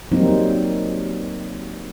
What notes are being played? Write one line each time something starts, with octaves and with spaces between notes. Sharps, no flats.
F#3 G3 A#3 C4 D#4